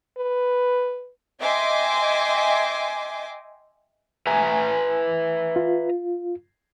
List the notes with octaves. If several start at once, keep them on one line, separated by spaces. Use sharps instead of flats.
B4
D#5 E5 G5 G#5 C6 D6
B4 E5 G#5 A#5
F4